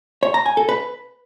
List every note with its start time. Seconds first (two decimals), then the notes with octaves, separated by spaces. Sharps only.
0.23 C#5
0.34 A#5
0.46 G#5
0.57 A4
0.69 B4